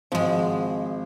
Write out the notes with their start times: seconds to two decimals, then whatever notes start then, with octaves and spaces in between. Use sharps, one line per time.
0.12 G#1 F3 G#3